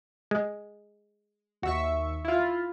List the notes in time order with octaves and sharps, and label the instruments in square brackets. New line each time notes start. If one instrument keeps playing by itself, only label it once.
[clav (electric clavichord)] G#3
[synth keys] D#2 E5 C#6 [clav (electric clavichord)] F#4
[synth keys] E4 F4